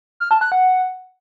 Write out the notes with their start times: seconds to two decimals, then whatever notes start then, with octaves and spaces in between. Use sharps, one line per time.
0.20 F6
0.31 A5
0.41 F#6
0.52 F#5